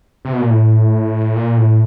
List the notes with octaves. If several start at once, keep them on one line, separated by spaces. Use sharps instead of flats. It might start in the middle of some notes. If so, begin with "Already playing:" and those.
C3
B2
A#2
A2
A#2
A2